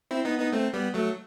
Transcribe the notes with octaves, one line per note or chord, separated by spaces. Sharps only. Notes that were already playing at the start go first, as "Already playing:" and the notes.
C4 E4
B3 D#4
B3 D#4
A3 C4
G3 B3
F#3 A3